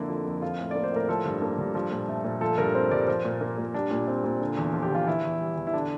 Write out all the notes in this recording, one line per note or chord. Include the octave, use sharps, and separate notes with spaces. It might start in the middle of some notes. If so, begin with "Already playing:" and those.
Already playing: F2 D3 A#3 E4
F3
F2
F3 F4
A2
A#3 D5
C5
A2 A#4
F3 A4
G2
A#3
G2
F3
A#2
A3
A#2
F3 A4
G2 A#4
C4 C5
G2 D5
F3 C5
A#2
A#3
A#2
G3 D4
A#2
C4
A#2
D3
E2
F3
G4
E2 F4
E3 E4
E2
G3
E2
E4
D3 D4